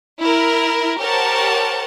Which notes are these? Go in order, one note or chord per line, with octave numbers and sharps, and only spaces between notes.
E4 A#4
G4 A#4 C5 C#5 F#5 A5